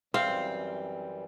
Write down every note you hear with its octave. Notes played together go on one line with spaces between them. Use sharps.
F#2 E3 G3 C4 F5